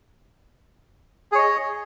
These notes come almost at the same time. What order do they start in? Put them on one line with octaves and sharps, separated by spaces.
G#4 C#5 D#5